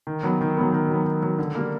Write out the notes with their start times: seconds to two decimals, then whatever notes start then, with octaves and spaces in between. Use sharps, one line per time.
0.07 D#3
0.23 F#3 B3
0.41 D#3
0.57 F#3 B3
0.72 D#3
0.89 F#3
0.94 B3
1.05 D#3
1.23 F#3 B3
1.39 D3
1.55 G3 A#3